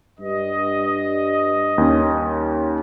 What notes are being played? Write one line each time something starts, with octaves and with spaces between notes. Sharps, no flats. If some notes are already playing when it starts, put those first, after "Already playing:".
G2 D#5
D#2 C#4